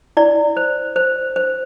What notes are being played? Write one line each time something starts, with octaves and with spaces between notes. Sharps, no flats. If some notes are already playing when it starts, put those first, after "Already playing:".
E4 D5
C5
C5
C5